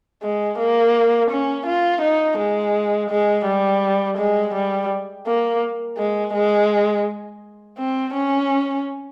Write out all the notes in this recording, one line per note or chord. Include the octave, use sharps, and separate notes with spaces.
G#3
A#3
C#4
F4
D#4
G#3
G#3
G3
G#3
G3
A#3
G#3
G#3
C4
C#4